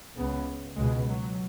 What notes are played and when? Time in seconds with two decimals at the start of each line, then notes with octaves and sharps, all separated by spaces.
0.16 C#2 C#3 B3
0.77 C#2 B2 G#3
1.08 F#3